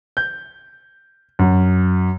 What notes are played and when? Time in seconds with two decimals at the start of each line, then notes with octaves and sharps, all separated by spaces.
0.17 G6
1.39 F#2